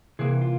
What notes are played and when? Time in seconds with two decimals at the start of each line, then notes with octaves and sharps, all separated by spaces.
0.19 C3 E3 A#3 G#4
0.41 F4